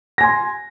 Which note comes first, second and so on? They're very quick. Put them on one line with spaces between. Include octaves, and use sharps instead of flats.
A#6 G#5 C6